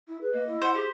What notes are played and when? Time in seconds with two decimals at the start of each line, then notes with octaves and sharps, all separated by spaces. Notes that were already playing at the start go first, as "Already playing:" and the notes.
0.07 E4
0.21 G#4 B4
0.33 A#3 D#5
0.47 E4
0.62 C5 F#5
0.75 G4 G#4